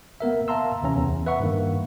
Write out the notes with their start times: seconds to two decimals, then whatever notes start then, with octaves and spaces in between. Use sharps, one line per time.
0.20 A#3 B3 A#4 E5
0.48 E5 F5 A5 A#5 C6 E6
0.82 D2 C3 E3 C#4 A#5
0.96 E2
1.26 B4 E5 F#5 C#6
1.40 G2 D#3 A#3